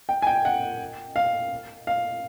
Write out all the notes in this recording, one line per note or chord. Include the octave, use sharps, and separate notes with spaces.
G5
G#5
G5
F#5
F5
F5